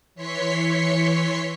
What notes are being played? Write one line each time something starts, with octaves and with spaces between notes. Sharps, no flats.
E3 C#5 C6 B6 C#7